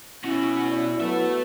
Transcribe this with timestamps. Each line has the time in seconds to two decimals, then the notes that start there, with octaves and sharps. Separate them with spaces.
0.24 B2 C#4 E4 F#4
0.69 D5
1.00 F#3 B3 A4 E5